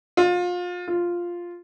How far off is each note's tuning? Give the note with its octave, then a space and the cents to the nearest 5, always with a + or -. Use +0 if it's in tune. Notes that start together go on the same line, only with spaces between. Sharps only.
F4 +30
F4 +0